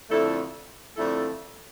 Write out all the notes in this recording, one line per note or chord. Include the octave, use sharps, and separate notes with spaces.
F2 D3 A3 E4 A4
F2 D3 A3 E4 A4